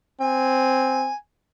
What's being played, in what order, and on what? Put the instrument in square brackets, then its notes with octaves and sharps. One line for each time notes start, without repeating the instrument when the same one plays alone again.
[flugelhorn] C4 [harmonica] G#5